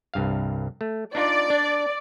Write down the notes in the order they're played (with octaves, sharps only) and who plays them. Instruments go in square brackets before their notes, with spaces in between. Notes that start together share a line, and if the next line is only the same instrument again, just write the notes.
[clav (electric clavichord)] C2 G2 F5
A3
[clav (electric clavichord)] D4 D#4 F4 [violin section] D5
[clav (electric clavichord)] D4